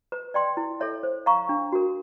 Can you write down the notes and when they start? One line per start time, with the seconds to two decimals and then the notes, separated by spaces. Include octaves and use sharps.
0.12 B4
0.34 D5 G5 C6
0.57 E4
0.80 A4 C#5 E5
1.03 C5
1.26 F5 A#5 C#6
1.49 D4
1.72 F#4 A#4